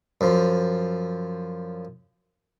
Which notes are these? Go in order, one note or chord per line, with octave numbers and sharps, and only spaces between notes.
F#2 F3